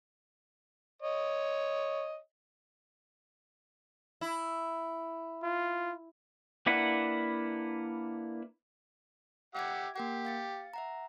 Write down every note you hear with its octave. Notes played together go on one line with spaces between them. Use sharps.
C#5 D#5
E4
F4
A#3 D4 E4 B4 F#5
G4 E5 F#5 D6 E6 G#6
A#3 G4 A#4 F#5
F5 A6 C#7
E5 F#5 A#5